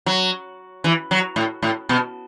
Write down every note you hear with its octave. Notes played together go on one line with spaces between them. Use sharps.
F#3
E3
F#3
A2
A2
B2